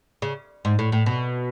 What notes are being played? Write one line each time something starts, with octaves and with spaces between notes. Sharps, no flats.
C#3
G#2
A2
A2
B2